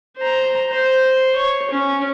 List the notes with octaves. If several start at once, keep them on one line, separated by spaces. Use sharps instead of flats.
C5 A#5
C5
C#5
C#4